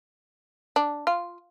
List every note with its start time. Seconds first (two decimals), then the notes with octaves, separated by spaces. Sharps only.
0.76 D4
1.07 F4